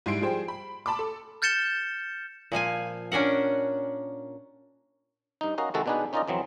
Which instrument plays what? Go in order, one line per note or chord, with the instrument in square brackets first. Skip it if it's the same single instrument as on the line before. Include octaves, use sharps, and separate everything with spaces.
[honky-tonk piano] G#2 G3 E4 C6 C7 D7
F3 G3 G#4 C5 G5
B5
A5 B5 C6 D6
A4
[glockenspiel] F6 G6 A6 C#7 E7 G7
[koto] A#2 F3 F5 G#5
C#4 D4 A#4 F#5
[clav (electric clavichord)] G2 D#4
C#4 F#4 A#4 D#5 F5
C3 D#3 G#3 F#4 A4
B2 B3 D4 D#4 G#4 B4
C#4 D#4 F4 A#4 D5 D#5
F2 E3 F#3 C4